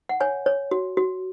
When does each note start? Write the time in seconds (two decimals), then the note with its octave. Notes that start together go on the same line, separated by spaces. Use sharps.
0.09 F#5
0.20 C#5 G#5
0.46 C#5
0.71 F#4
0.97 F#4